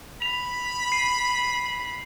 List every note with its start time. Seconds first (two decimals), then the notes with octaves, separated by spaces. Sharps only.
0.22 B5 B6 F7
0.92 C7 D#7